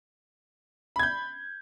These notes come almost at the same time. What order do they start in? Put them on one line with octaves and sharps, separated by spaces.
B5 G#6 G6